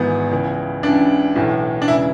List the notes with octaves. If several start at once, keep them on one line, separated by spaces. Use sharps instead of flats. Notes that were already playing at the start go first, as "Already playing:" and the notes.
Already playing: G#1 G#2 E3 B3
C#2 C#3 E3
C#2 C#3 E3 D4
B1 A2 E3
D4
E1 C#3 E3 E4